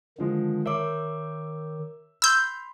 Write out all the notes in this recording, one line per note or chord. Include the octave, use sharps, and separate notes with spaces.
D3 D#3 F3 G#3
A#4 C#5 E5 D6
B5 C6 E6 G6